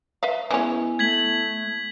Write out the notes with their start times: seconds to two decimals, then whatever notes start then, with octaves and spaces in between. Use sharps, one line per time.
0.23 B4 E5 F5
0.51 E3 G#3 B3 C#4 E4
0.99 A3 G#6 B6 F#7